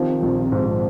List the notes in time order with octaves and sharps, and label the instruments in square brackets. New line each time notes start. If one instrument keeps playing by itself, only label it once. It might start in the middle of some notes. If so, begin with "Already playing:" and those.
Already playing: [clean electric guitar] C3 [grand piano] D#3 F3
[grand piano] A#1
G#2